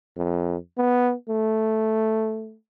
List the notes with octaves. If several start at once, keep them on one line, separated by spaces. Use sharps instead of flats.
F2
B3
A3